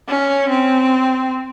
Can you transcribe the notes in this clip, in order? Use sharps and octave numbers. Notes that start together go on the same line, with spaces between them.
C#4
C4